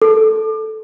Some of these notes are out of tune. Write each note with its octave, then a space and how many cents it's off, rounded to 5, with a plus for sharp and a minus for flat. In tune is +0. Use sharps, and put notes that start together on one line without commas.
A4 -5